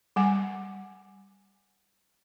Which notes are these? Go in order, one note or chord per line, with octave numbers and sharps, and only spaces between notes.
G3 F#5 G#5